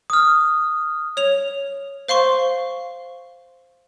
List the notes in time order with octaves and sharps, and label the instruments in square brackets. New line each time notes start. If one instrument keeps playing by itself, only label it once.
[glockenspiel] D#6 F6
[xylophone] C#5 F7
C5 F5 C6 C#6